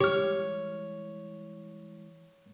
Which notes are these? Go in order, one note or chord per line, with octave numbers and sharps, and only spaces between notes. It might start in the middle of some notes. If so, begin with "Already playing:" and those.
E3 G3 G#3 G4 C#5 F6